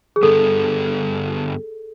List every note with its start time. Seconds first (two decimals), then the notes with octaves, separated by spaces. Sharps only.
0.16 G#4
0.22 G2 D3 G3 B3 A4